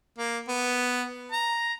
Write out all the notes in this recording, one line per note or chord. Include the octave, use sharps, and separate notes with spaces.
A#3
B3
A#5